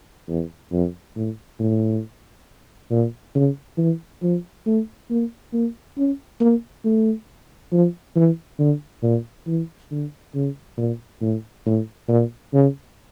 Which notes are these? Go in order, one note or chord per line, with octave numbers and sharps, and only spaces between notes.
E2
F2
A2
A2
A#2
C#3
E3
F3
A3
A#3
A#3
C#4
A#3
A3
F3
E3
D3
A#2
E3
D3
C#3
A#2
A2
A2
A#2
C#3